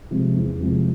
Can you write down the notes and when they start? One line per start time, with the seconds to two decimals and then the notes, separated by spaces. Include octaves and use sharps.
0.11 C3 F3 G#3 C4
0.36 E2
0.60 C3 F3 G#3 C4